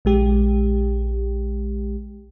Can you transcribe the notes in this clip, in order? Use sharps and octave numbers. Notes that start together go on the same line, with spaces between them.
A#1 G#3 G4